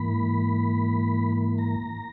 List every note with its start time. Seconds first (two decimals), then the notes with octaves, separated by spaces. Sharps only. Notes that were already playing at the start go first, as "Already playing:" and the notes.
Already playing: G#2 E3 A#3 B5
1.58 A#5